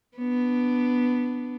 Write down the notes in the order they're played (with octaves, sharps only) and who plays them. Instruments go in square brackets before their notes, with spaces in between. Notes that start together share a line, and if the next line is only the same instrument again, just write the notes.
[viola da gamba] B3 D4